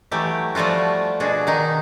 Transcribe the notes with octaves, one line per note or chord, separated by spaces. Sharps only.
E3 F#3 A3 G4
F3 G3 A3 F4 F#4
B2 D4 F#4 G#4
D#3 D#4